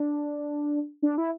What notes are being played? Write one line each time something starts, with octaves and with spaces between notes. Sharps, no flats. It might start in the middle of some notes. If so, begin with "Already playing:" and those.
Already playing: D4
D4
E4